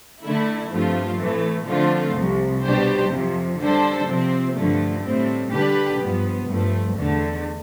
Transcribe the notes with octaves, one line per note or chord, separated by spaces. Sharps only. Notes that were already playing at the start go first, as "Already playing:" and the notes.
D3 A3 E4
G2 F3 A3 C4 F4
A2 E3 A3
D3 F3 A3 C4 F4
C2 C3 F3
B2 G3 D4 G4 C5
F2 C3 F3
D3 G3 D4 A4 C5
C3 F3 C4
G2 D3 F3 A3
A2 G3 C4
D3 G3 D4 G4 B4
G2 F3 B3
G2 F3 A3
E2 D3 A3